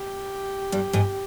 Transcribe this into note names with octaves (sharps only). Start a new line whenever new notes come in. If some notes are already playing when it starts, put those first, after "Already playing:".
Already playing: G4
G2 G3
G#2 G#3